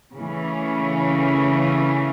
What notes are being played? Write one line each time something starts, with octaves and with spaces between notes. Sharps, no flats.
C#3 E3 A3 C#4